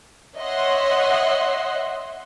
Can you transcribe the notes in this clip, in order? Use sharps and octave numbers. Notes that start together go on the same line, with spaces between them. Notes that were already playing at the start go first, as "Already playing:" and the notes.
C#5 D#5 E5 F#5 C6